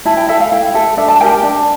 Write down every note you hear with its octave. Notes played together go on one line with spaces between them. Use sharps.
E4 A5
G5
A4 E5
F5
E4 G5
A4 E5
D4 E5
A5
G4 A#4 G5
A5
D4